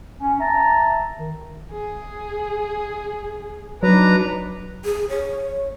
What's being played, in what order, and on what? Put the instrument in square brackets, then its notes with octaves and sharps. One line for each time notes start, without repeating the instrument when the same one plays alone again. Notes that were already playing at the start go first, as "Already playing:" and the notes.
[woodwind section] C#4
E5 A5 A#5
D#3
[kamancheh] G#4
[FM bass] F#3 [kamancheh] D4 D#4 [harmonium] B4 A#5
[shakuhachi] G#4
C#5